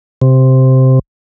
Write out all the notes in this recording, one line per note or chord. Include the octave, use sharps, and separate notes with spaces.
C3